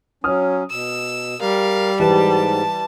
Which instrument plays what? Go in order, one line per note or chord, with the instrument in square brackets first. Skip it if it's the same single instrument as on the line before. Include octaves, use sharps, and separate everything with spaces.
[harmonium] F#3 C#4 [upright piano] D#6 F6
[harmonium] B2 [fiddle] E6
[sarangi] G3 [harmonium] A#4 [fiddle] F5
[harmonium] G#2 [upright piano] E3 G4 B4 [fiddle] A5